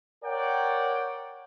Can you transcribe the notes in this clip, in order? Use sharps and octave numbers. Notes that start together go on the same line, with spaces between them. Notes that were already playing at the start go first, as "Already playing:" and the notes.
A#4 C#5 D5 F#5 G5